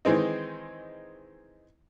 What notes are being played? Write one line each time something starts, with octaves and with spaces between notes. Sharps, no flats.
D#3 E3 G#3 C4 D#4